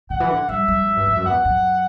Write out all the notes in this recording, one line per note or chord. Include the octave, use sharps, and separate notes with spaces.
D3 F#5
E3
D3
G3 E5
G3
F#3
G2
G2
F#2
E2 F#5
F#2